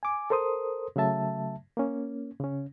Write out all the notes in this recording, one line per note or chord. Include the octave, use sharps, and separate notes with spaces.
G#5 D6
A4 A#4 C5 C6 D#6
C#3 F#3 A3 E5 A5
A#3 C#4
C#3 C#4